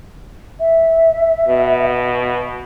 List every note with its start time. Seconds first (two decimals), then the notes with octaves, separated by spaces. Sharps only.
0.59 E5
1.48 B2